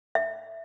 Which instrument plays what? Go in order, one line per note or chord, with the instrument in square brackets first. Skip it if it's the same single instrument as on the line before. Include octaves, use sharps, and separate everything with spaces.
[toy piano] E5